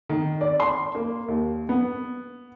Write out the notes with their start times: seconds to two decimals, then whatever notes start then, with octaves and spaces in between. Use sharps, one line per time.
0.09 D#3
0.41 D5
0.60 C6
0.95 A#3
1.28 D#2
1.69 B3